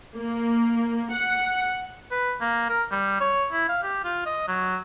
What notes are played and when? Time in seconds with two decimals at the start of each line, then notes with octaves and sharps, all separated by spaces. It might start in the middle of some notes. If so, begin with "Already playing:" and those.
0.17 A#3
1.12 F#5
2.11 B4
2.41 A#3
2.69 A#4
2.91 G3
3.21 C#5
3.52 E4
3.69 F5
3.83 G4
4.04 F4
4.26 D#5
4.48 F#3